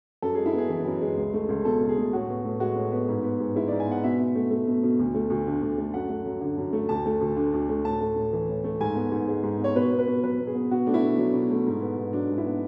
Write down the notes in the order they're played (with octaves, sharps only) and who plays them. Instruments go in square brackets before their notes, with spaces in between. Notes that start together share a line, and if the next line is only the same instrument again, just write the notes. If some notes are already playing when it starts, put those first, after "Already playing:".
[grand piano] F#2 A4
G#3 G#4
E4
B3 G#4
E3
F#2
G#3
C#2
A3
C#2
B2 A4
C#2
G#4
A3
A2 F#4
B3
A2
G#3 F#4
A2
B3
G#2
B3
G#2
G#3 E4
G#2 D5
G#5
B3 F#5
B2 E5
B2
A3
A3
B2
B2
D2
A3
D2
D3
D2
A3
F#2 F#5
A3
F#2
D3
F#2
A3
D2 A5
A3
D2
D3
D2
A3
A2 A5
A3
A2
E3
A2
A3
G#2 G#5
B3
G#2
G#3
G#2
B3
C#5
B2 B4
B3
B4
B2
F#3 B4
B2
G#4
B3
B2 F#4
A3 D4
E4
B2
F#3
B2
A3
G#2
B3
G#2
F#3 D4
G#2
E4
B3